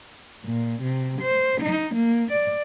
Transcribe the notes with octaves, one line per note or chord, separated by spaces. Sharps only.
A#2
C3
C5
D#4
A#3
D5